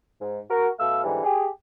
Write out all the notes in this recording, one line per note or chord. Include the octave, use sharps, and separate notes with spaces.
G#2
F#4 A#4
B2 A3 F5 E6
G#2 D3 E3 G3
G4 G#4